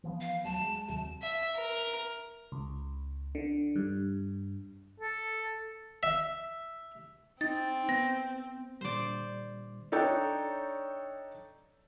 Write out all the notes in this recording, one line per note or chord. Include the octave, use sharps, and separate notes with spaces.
E3 F3 B3
F5
D2 F#3 A5
G#3
D#2 C3 F#3 A5
E5
A#4
C#2
D3
G2
A4
E5
C4 D#4 A6
B3 A#6
A#2 D3 G3 C5 D5
D4 D#4 A4 C#5 G5